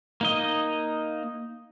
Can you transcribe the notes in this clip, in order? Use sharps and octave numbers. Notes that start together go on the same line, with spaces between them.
A#3 D#4 D#5